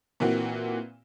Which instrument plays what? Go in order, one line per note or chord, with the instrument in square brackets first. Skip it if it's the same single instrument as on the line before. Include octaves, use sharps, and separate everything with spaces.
[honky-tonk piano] A#2 E3 A#3 C4 F#4